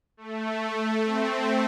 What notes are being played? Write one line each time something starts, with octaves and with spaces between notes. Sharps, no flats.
A3
A3
C4